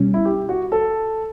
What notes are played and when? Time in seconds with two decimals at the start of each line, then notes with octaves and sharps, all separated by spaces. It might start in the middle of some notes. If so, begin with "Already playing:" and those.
Already playing: B2 G3 C#4
0.14 E4
0.25 G4
0.49 F#4
0.72 A4